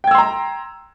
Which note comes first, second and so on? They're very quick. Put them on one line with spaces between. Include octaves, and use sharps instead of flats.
G5 G#6 E6 C6 A#5